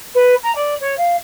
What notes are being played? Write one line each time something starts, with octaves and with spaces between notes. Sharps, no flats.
B4
A#5
D5
C#5
F5